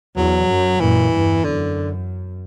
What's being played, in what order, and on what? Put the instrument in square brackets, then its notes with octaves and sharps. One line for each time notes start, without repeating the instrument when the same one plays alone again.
[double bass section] E2 [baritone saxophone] F#3
[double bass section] F#2
[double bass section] F#2 A#2 [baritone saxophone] E3
[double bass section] E2 G2
[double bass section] F#2 [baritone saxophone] D3